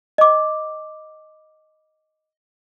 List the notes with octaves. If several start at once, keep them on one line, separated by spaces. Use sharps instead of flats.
D#5 D6